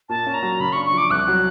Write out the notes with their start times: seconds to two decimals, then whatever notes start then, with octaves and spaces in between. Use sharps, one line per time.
0.09 A#2 A5
0.26 C#4
0.34 A#5
0.42 F#3
0.60 C#3 B5
0.73 D4 C#6
0.85 C#6
0.93 F3 D6
1.10 C2 F#6
1.28 F#3